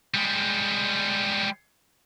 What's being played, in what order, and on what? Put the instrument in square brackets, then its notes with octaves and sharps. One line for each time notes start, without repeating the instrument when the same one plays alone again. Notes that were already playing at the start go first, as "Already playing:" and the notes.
[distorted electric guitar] G3 G#3